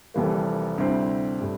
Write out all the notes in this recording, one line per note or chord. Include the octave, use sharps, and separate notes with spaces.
F1 F2 E3 G3 A#3
D2 C3 G3 C4 E4
A2 G3 D4